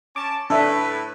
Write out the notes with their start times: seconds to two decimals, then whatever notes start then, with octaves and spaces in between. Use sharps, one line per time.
0.16 C#4 A5 D6
0.50 A2 D4 A4 B4 E5